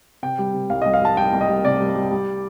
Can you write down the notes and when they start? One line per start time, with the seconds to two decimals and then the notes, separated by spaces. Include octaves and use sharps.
0.23 C3 G5
0.38 G3
0.54 C3
0.70 C2 F5
0.82 D#5
0.85 C2
0.94 F5
1.01 G3 A5
1.17 G3 G5
1.33 C2
1.41 D#5
1.48 G3
1.64 C3 D5
1.80 G3
1.96 G3
2.11 G3